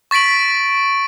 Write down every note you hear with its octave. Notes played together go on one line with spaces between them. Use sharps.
C#6 A6 B6 D7 F#7